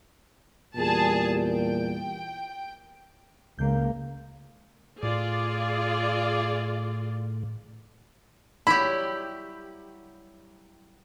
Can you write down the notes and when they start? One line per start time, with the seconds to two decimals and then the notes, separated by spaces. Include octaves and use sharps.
0.76 E2 A#2 G3 G#4 A5
1.41 G5
3.59 C#2 C#3 A#3 G6
5.03 A2 F4 G#4 D5
8.67 F#3 G3 E4 G4 B5